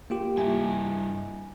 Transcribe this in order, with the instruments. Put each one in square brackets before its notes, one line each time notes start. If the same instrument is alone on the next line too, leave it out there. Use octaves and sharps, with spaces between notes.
[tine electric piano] A#3 F4 G4
[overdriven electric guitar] G2 E4 [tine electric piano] G#5